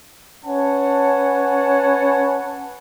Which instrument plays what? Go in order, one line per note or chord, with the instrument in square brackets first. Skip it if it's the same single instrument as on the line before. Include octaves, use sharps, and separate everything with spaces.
[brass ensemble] C#4 B4 C#5 F#5 G#5 A5